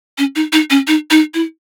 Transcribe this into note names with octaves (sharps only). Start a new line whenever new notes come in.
C#4
D#4
D#4
C#4
D#4
D#4
E4